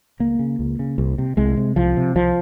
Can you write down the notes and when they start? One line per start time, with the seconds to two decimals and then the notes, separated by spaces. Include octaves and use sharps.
0.20 C#2 A#3
0.39 C#3
0.59 C#2
0.79 C#3
0.98 C2
1.18 C3
1.37 C2 G#3
1.57 C3
1.76 C2 F3
1.97 C3
2.15 C2 F3